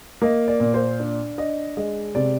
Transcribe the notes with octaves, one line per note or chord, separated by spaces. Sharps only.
A#3 D#5
D5
A#2
C5
D4
D4 D#5
G#3 D#5
C3 D5